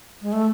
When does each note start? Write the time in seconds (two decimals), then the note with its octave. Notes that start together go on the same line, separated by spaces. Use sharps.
0.22 G#3
0.32 A3